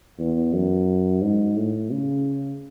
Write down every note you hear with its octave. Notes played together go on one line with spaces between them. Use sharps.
E2
F#2
G#2
A2
C#3